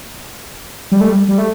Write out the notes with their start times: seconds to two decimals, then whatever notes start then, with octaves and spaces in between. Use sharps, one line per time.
0.92 G3
1.01 A3
1.09 G3
1.28 G3
1.38 A3